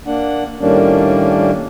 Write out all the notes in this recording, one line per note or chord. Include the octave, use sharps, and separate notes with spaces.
A#3 D4 F#5
A2 D#3 G3 A#3 C#4 D4